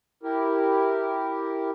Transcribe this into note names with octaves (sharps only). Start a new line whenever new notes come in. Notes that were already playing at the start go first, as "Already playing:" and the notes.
E4 G4 A#4